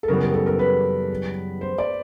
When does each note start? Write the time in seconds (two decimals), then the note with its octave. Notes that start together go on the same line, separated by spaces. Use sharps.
0.03 A4
0.08 F#2 C#3 E3 G3 B3 A#4
0.21 A#4
0.34 A4
0.46 A#4
0.59 B4
1.61 C5
1.78 D5